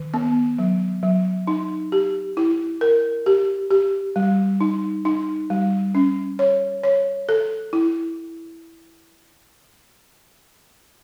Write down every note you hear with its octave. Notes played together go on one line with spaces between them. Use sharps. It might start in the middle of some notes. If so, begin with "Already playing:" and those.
Already playing: D#3
B3
F#3
F#3
D#4
G4
E4
A#4
G4
G4
G3
D#4
D#4
G3
C#4
C#5
C#5
A4
E4